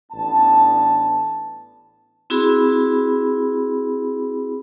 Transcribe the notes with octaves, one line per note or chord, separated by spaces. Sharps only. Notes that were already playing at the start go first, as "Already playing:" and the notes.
A1 B3 D4 A5
C4 E4 F#4 G#4 B5